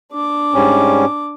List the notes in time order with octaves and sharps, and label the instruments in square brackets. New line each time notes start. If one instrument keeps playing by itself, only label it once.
[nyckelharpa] D4 D6
[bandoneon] G#2 G3 C#4